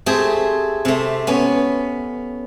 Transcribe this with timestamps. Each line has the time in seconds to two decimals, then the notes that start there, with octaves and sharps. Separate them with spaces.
0.06 A3 C4 G4 G#4
0.85 C3 A3
1.27 B3 C#4